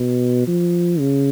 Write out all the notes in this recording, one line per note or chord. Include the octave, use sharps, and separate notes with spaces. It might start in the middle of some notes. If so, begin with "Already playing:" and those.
Already playing: B2
F3
C#3